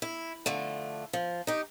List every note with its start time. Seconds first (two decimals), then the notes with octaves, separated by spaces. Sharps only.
0.02 E4
0.46 D3 F3 A3
1.13 F3
1.47 D#4 G4